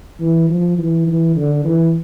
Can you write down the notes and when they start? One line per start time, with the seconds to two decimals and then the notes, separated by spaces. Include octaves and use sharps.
0.20 E3
0.49 F3
0.78 E3
1.07 E3
1.36 D3
1.64 E3